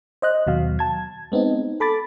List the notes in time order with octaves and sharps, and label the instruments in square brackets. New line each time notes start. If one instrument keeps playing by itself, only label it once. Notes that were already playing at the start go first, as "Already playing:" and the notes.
[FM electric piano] C5 D#5 F#6
D#2 B2 F#3 F5
A5 G#6
G#3 B3 C4 D#4
A4 B5 D6 A6